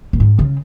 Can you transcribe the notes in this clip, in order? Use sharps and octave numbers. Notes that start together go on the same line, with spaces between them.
A#2
G#2
C#3